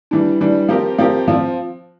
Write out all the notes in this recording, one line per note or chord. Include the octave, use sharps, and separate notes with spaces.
E3 G3 D4
E3 G3 D4
F3 C4 G4 A#4
F3 C4 G4 A#4
F3 C4 F4